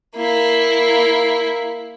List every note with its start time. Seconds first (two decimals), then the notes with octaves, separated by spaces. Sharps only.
0.16 A#3 E4